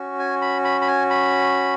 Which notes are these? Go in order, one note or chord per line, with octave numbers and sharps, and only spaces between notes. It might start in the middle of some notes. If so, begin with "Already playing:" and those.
Already playing: C#4 F#4
G#5
B5
B5
B5
G#5
B5